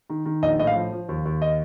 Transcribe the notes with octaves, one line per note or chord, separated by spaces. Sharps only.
D#3
D#3
A#1 D#5
A2 D#5
F5
F3
F3
D#2
D#2
D#5